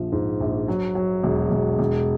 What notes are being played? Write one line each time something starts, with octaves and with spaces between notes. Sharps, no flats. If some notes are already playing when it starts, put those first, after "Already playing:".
Already playing: A#1 F3
G#2
A#1
F#3
F#3
E1
E1
E1